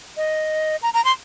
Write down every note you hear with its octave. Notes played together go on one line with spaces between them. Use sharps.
D#5
A#5
A#5
C6